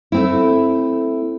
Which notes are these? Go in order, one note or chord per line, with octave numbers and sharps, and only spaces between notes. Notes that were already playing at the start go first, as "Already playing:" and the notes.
A3 C4 E4